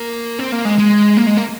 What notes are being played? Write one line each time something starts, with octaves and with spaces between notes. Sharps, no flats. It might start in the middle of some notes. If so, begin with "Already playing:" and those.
Already playing: A#3
C4
A#3
G#3
G#3
A#3
G#3
A#3